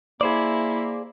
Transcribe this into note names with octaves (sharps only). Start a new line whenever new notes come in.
A#3 E4 G#4 C5 D5